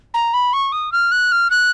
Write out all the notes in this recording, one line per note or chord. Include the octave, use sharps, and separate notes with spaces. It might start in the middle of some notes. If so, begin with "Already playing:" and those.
A#5
B5
C#6
D#6
F6
F#6
F6
F#6